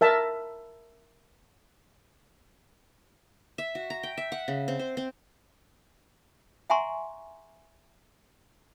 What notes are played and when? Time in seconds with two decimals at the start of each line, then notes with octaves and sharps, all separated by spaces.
0.01 A#4 E5 A5
3.58 E5
3.75 F#4
3.90 A#5
4.03 G5
4.17 E5
4.32 F#5
4.48 C#3
4.68 C4
4.79 C5
4.97 C4
6.70 E5 F#5 G#5 A#5 C6 C#6